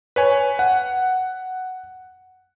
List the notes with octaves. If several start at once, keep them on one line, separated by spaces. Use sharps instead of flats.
B4 C#5 G#5
F#5